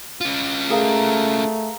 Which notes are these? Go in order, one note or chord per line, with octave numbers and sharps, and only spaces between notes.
C#4 F4
A3 G#4 A#4 F5